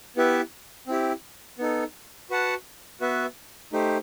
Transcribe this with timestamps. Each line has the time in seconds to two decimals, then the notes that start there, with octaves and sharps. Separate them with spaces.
0.16 B3 E4 G4 B4 E5
0.87 C4 E4 G4
1.59 B3 D#4 A4
2.30 F#4 B4 F#5 A5
3.01 B3 F#4 B4 E5
3.73 A3 D#4 G4 C5